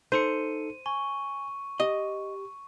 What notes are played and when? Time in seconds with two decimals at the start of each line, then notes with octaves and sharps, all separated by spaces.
0.12 D#4 A4 C5 C#7 D#7
0.86 G#5 C#6
1.80 G4 D#5